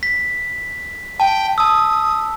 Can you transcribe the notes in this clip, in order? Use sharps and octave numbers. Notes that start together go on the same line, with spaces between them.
B6
G5 A5
A5 D#6 E6